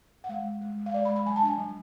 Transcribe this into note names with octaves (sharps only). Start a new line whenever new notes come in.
F#5
G#3 F5
G#3
G#3
G#3
F5
G#3 D5
B5
G#3
B5
F#3 G#5
A5
D4 G#5
F#3